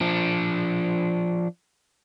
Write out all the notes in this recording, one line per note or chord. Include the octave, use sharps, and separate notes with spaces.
F3 D4